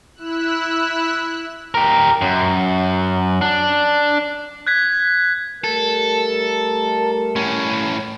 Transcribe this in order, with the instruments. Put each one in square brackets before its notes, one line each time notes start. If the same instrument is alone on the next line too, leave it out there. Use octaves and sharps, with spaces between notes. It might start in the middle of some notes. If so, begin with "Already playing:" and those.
[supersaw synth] E4 E6 F#6
[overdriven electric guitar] G4 A#4
F#2
D4
[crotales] F#6 G#6 B6
[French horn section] G3 A3 A#4 [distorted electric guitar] A4
[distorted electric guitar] A2 C#4